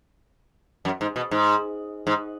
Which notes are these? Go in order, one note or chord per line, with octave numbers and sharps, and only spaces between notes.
F#2
G#2
B2
G#2
G#2